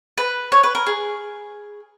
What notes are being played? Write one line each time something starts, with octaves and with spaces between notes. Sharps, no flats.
B4
C#5
B4
A#4
G#4